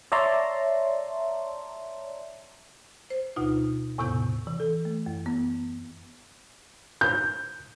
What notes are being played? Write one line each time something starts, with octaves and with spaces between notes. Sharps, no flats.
C#5 D5 E5 A5 A#5 C6
C5
D2 B2 D#4 F4
E2 A2 C3 B3 G6
E3
A4
A3
F#2
B3
G6